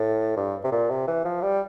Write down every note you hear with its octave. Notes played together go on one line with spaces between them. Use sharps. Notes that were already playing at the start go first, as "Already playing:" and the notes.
Already playing: A2
G2
C3
A#2
C3
E3
F3
G3